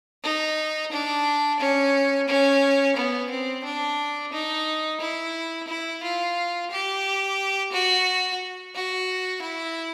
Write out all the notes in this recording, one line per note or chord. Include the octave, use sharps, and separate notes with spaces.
D#4
D4
C#4
C#4
B3
C4
D4
D#4
E4
E4
F4
G4
F#4
F#4
E4